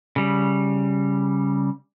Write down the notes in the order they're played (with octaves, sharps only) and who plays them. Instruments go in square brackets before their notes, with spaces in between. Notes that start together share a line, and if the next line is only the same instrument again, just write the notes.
[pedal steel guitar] C#3 G3